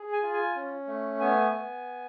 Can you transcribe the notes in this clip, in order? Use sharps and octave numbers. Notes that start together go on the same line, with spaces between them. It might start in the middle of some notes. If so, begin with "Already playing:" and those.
Already playing: G#4
G#5
F4
G#5
C#4
A3
B3 G#5
B3